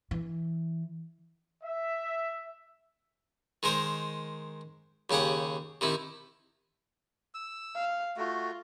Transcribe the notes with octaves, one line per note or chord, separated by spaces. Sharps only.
E3
E5
D#3 G#3 A#4 C5
D#2 C#3 G4 G#4 F#5
C3 D#3 E4
E6
F5
A3 F4 F#4